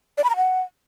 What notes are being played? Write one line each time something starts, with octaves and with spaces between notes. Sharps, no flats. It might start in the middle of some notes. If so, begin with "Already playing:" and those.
D5
B5
A#5
F#5